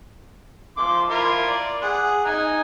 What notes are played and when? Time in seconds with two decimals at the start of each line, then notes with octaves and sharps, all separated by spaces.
0.77 F3 C6 D6
1.09 E4 F4 A#4
1.47 D5
1.82 G#4 F#5
2.25 D#4 G#5 A#5